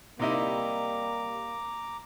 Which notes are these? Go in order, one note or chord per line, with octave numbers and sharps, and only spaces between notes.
C3 G3 A#3 D#4 E4 A#5 D6